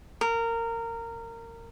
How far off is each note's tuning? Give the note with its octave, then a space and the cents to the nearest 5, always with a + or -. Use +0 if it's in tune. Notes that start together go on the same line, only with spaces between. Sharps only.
A#4 -20